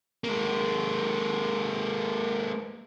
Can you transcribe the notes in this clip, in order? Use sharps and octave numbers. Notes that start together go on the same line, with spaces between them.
G#3 A#3